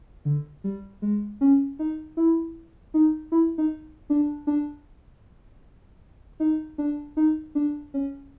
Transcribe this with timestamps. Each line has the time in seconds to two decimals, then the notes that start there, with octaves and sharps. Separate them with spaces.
0.25 D3
0.64 G3
1.02 G#3
1.41 C#4
1.79 D#4
2.17 E4
2.94 D#4
3.32 E4
3.58 D#4
4.10 D4
4.47 D4
6.40 D#4
6.78 D4
7.17 D#4
7.55 D4
7.94 C#4